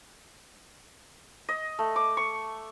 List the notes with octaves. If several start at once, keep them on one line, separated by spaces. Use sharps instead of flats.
D#5
A3
D6
C#6